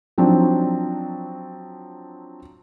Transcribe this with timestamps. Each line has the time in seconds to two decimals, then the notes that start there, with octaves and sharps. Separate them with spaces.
0.18 F3 F#3 C4 D4 D#4